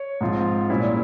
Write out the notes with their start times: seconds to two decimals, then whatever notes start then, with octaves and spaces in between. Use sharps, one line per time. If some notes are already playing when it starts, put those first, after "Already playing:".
Already playing: C#5
0.21 G#2 F3 C4 F4
0.69 A#2 G3 C#4 E4